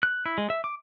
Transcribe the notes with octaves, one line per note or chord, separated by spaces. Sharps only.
F#6
E4
G#3
E5
D6